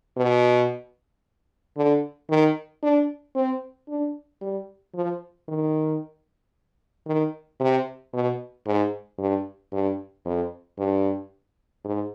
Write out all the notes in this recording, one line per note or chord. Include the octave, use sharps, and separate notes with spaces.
B2
D3
D#3
D4
C4
D4
G3
F3
D#3
D#3
C3
B2
G#2
G2
G2
F2
G2
G#2